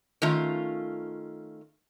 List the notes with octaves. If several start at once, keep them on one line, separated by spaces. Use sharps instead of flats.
D#3 A3 C#4 F4